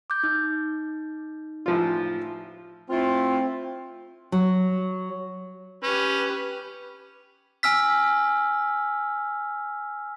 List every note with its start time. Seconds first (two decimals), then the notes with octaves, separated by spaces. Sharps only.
0.10 D6 G6
0.23 D#4
1.66 A1 F3 F4
2.90 A3 C4 E4 F4
4.32 F#3
5.83 C#4 G4 B4
7.63 G#5 E6 F6 B6